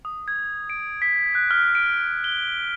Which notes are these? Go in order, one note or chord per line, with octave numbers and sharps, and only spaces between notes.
D#6
G#6
D7
B6
F#6
F6
D7
G7